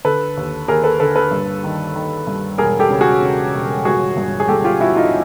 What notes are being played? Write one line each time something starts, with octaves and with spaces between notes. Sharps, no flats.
D3 A4 B4
D#2
D#2 G#4 A#4
A4 B4
D3 A4 B4
A4 B4
G2
D#3
D#3
G2
E1 G#4 A#4
G4 A4
C#3
F#4 G#4
C#3
E1
G1 F#4 G#4
G2
G#4
G1 G4 A4
F4 G4
G1 E4 F#4
D#4 F4